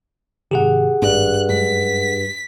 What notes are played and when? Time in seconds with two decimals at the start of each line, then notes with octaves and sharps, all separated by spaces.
0.51 G#2 C3 D#3 G4 G#4 F#5
1.02 G#1 G2 F#6
1.49 F#2 G#3 D4 B6